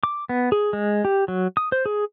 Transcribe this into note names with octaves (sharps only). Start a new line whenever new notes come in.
D6
B3
G#4
G#3
G4
F#3
D#6
C5
G#4